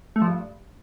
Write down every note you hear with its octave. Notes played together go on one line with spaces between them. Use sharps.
A3
F3
G2